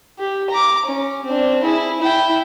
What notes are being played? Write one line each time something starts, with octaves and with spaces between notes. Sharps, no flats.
G4
A#5 D6
C#4
C4 D4
E4 G#4
E4 G5